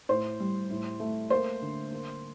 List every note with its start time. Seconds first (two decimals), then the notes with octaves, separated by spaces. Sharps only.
0.09 A2 C5
0.40 G3
0.70 A2
1.00 A3
1.30 A#3 C5
1.61 D3
1.91 A#3